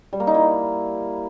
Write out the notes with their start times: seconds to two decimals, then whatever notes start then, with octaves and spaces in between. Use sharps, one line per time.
0.13 G3
0.20 A#3
0.27 D#4
0.34 E4